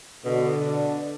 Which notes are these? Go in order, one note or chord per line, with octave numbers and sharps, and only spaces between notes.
B2 D3
D4